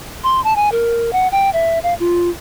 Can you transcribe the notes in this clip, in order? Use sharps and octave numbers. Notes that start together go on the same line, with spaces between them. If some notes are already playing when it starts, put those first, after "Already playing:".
C6
A5
G#5
A#4
F#5
G5
E5
F5
F4